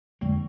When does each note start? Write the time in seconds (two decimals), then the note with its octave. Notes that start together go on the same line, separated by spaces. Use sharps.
0.21 F2 D3 F#3 G#3 A#3